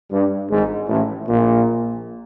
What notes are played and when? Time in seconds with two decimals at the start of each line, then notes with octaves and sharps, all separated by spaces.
0.12 G2
0.50 G#1 G#2
0.89 A1 A2
1.27 A#1 A#2